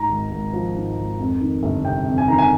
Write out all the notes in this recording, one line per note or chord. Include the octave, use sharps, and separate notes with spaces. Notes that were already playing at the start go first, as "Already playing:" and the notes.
Already playing: G#2 A#5
G#1
G#1
F3
G#2
G#1
F2
D#3
G1
C3 G5
F2
G#5
D#3 A#5
G#5